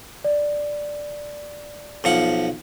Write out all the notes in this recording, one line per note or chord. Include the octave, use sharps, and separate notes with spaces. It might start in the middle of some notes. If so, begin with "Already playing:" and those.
D5
B1 F3 F#5